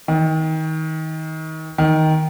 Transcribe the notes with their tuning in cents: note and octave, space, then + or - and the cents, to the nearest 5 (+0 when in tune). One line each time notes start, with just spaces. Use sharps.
D#3 +30
D#3 +10